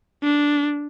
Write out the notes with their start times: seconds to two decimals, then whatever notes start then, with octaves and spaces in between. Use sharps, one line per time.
0.23 D4